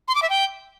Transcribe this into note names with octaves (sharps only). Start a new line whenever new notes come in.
C6
D6
E5
G5